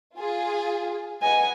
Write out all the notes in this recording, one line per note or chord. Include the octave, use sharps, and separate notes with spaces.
F4 G#4
B4 D#5 F#5 G#5